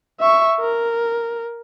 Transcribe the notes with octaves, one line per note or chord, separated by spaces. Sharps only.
E5 C#6
A#4